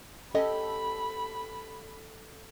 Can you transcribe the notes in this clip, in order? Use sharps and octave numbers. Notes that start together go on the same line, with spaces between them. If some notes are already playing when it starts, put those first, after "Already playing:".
C#4 G4 A4 D#5 B5